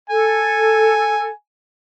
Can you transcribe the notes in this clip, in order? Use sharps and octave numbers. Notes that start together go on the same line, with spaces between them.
A4 G#5